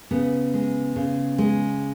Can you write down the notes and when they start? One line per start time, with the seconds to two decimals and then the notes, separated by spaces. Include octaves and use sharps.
0.11 C#3 B3
0.54 G#3
0.96 C#3
1.38 G#3